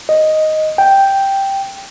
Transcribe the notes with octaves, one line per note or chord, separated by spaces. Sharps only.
D#5
G5